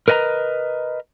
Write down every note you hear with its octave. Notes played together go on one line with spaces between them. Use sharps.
A#4 B4 D#5 F#5 A#5